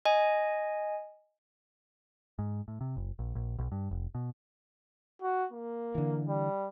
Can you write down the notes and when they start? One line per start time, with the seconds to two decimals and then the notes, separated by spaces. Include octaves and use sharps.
0.05 D#5 G#5
2.39 G#2
2.68 A2
2.81 C3
2.97 F#1
3.19 A#1
3.35 A#1
3.59 B1
3.72 G2
3.91 F1
4.15 B2
5.22 F#4
5.52 A#3
5.95 D3 E3
6.27 G3